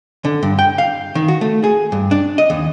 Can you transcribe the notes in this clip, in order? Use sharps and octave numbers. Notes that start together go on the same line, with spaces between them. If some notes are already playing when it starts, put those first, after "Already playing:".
D3
G2
G5
F5
D#3
F#4
A3
G#4
G2
D4
D#5
D#2